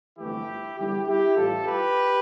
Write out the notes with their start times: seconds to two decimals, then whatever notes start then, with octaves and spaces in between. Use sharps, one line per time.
0.18 G1 F2 E3 A3 E4 G4
0.77 E2 D3 G3 E4 G4
1.07 E4 G4
1.36 A1 A2 G3 F4 A4
1.65 G4 B4